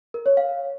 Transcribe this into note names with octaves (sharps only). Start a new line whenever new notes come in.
A#4
C#5
F5